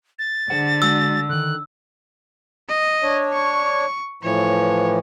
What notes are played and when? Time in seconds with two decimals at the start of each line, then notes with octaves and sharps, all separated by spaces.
0.19 A6
0.50 D3 G#4 C5 F#5
0.82 G#3 F#4 E6
1.29 D3 D#3 F#6
2.69 D#5
3.03 D4 C#5
3.33 C#6
4.23 A2 E3 F3 C#5